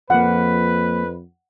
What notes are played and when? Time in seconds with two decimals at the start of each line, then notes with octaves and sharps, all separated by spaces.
0.10 F2 F3 A#3 B4 F#5